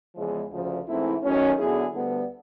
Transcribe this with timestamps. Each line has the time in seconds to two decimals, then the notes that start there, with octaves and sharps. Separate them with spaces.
0.15 E2 C#3 F3 G#3
0.51 D2 C#3 F3
0.86 G#2 E3 A3 C4 E4
1.23 F#2 D#3 F#3 A3 C#4
1.59 D3 F#3 B3 E4 G#4
1.94 D2 D3 G3 B3